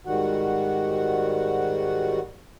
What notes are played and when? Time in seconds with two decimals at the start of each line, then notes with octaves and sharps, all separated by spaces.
0.06 G#2 D#3 G3 F#4 F#5